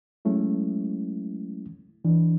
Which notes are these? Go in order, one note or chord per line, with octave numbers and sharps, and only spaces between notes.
F#3 G#3 A3 C#4 E4
E3 D4